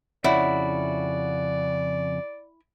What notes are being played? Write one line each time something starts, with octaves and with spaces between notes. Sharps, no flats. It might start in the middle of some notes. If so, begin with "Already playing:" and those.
F2 C#3 E4 F#4 C#5 D5 E5 F#5